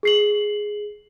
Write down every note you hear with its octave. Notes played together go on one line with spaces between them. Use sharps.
G#4 C7 F#7